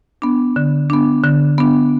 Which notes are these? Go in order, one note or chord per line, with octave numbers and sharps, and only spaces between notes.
B3 D4
D3
B3 D4
D3
B3 D4